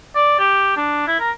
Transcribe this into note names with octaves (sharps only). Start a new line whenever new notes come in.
D5
G4
D4
E4
A#4